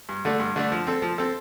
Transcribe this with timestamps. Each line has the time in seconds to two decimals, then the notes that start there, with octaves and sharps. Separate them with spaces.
0.09 G2
0.25 D3 A3 D4
0.40 G2
0.56 D3 A3 D4
0.72 F3
0.87 C4 A4
1.02 F3
1.18 C4 A4